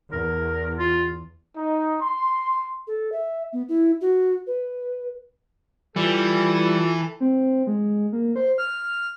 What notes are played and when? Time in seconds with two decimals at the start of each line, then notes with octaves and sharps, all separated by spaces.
0.12 E2 A#4
0.78 F4
1.56 D#4
2.01 C6
2.87 A4
3.12 E5
3.53 B3
3.69 E4
4.01 F#4
4.47 B4
5.96 E3 G3 F4 A4
7.20 C4
7.67 G#3
8.13 A#3
8.36 C5
8.58 F6